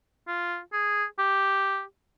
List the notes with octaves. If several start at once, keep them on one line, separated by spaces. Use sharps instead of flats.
F4
G#4
G4